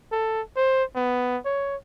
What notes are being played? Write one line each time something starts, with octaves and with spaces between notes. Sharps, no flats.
A4
C5
B3
C#5